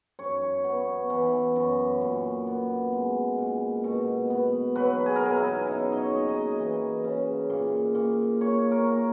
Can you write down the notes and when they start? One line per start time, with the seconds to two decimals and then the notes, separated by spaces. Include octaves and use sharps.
0.19 F#2 C#5
0.64 B3
1.10 E3
1.56 F#2
2.01 A#2
2.47 B3
2.93 G#3
3.38 A#2
3.84 B2
4.30 B3
4.75 F#3 B4
5.06 G#4
5.16 A#4
5.21 B2 G#4
5.36 E4
5.67 C#3 D#4
5.92 D#5
5.98 C#5
6.12 A#3
6.28 D#5
6.58 E3
7.04 C#3
7.50 A#2
7.95 A#2
8.41 A#3 C#5
8.72 A#4
8.86 A#3